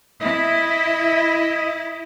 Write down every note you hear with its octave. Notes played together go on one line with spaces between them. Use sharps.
E4 D#5